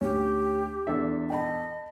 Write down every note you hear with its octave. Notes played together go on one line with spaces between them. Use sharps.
D2 C#4 G4
E2 D4 A4 E5
D#5 G5 A5 B5